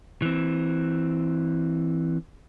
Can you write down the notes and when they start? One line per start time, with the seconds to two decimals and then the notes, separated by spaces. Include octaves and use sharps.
0.22 E3 C4